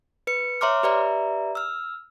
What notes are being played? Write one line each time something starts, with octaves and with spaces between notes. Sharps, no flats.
B4 C#7
C#5 E5 A#5 C6 D6 F6
G4 B4 D5 E5 A#5
E6 F6